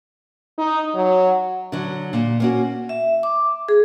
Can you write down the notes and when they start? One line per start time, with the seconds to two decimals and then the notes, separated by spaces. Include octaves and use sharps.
0.58 D#4
0.95 F#3
1.72 D3 F#3
2.13 A#2
2.40 A#3 C#4 F#4
2.89 E5
3.23 D6
3.69 G#4